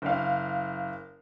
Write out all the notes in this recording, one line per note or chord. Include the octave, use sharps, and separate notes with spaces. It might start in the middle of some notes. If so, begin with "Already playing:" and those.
F#1 F5